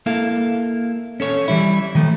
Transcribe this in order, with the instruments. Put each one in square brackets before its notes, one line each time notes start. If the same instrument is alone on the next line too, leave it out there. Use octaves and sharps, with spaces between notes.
[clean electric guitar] A#3 E4 A4 F5
C#4 A4 C#5
E3 G3 E4
D#3 F3 A3